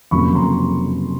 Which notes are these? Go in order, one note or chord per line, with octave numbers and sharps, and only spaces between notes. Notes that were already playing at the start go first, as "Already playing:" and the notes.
F1 F2 C#3 F#3 A#3 B5 C#6
A#5 C6